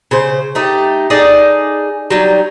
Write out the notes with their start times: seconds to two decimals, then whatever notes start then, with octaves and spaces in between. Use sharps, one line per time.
0.11 C#3 C5
0.55 A3 D#4 G4
1.10 D#4 G#4 A4 D5
2.10 F#3 G3 D#4